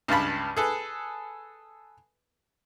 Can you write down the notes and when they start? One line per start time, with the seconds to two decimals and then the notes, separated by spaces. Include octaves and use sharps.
0.08 C#2 G2 F5 A5 B5
0.57 G#4 A4 B4